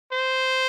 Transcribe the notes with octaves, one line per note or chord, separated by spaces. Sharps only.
C5